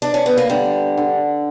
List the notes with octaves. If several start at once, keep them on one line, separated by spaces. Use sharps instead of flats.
D4
C#4
B3
A#3
D3 G3
D3